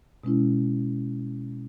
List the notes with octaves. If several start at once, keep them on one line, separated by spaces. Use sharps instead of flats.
B2 G#3 C#4 E4